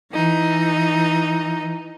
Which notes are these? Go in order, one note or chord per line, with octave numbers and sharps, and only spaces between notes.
E3 D#4